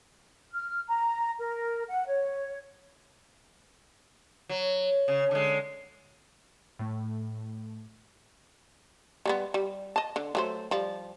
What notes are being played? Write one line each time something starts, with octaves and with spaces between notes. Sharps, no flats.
F6
A#5
A#4
F#5
C#5
F#3
C#3
D3 G#3
A2 A3
G3 A#3 B3
G3
D#5 A5
D3
F#3 A3 C5
F3 G3